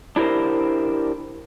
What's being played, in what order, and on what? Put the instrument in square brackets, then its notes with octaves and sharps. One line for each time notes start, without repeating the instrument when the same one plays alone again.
[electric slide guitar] D4 E4 G4 A#4 C5